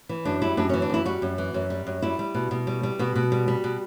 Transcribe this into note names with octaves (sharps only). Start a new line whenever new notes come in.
E3
F#2 D4
G3 E4
F#2 D4
E3 C#4
D4
F#2 E4
G3 F#4
F#2
E3
F#2
G3
F#2
G3 E4
G3
B2
B2
G3
G3
B2 F#4
B2
G3
G3
B2